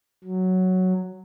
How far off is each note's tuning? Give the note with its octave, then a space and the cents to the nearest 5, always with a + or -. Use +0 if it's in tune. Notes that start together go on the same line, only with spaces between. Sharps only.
F#3 +0